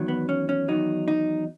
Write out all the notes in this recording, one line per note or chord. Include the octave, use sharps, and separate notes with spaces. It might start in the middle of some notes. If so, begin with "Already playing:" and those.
Already playing: E2 D#3 F#3
B3
C#4
C#4
E2 D#3 F#3 D#4
D#4